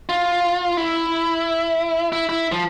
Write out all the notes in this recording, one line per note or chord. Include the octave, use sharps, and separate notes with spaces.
F4
E4
E4
E4
F3